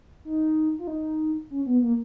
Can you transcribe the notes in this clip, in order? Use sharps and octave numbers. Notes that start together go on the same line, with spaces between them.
D#4
F4
D#4
C#4
B3
A#3